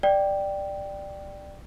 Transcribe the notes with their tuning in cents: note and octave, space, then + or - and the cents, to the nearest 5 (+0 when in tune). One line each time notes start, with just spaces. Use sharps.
D5 +10 G5 +0